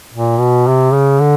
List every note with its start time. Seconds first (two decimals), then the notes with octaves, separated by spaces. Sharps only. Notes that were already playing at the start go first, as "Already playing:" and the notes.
0.14 A#2
0.39 B2
0.67 C3
0.93 C#3
1.20 D3